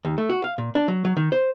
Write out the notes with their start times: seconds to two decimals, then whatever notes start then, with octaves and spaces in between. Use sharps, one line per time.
0.05 D#2
0.18 A3
0.30 F#4
0.44 F5
0.58 A#2
0.75 D4
0.88 F#3
1.05 F#3
1.17 D#3
1.32 C5